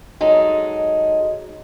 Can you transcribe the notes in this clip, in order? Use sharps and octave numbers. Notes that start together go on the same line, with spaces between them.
F#3 G#3 D#4 A4